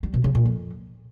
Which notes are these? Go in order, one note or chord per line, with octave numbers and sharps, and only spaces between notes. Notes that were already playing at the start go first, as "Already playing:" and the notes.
G3
B2
C#3
A#2
F2